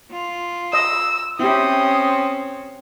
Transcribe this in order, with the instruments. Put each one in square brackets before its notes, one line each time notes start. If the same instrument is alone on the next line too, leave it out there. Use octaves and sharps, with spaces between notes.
[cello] F4
[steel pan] D#5 [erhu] E6
[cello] C4 C#4 [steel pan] E4 G4 [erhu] D#6